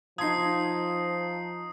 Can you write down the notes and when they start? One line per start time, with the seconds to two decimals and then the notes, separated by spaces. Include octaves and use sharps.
0.18 F3 D#4 F5 A5 C6 D#6 G#6 C7